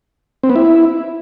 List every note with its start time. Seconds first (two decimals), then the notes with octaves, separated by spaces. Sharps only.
0.43 C4
0.50 B3
0.56 E4